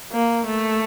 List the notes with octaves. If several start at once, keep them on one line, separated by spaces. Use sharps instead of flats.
A#3
A3